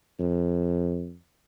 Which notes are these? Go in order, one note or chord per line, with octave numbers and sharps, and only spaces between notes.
F2